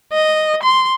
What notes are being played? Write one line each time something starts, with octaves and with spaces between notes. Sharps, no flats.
D#5
C6